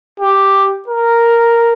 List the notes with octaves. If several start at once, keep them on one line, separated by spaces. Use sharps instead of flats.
G4
A#4